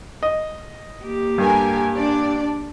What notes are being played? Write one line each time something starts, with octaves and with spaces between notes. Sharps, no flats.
D#5
A#3 G4
G2 A4 A#4 G#5
D4 D5